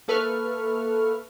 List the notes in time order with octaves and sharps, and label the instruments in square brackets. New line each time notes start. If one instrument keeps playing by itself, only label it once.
[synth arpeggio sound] A#3 A4 B4 E5 C#6 F6